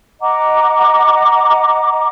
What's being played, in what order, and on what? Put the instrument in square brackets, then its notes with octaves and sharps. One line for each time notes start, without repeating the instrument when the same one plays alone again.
[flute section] D#5 F#5 A#5 D6